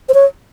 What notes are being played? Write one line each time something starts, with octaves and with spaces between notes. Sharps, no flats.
C5
C#5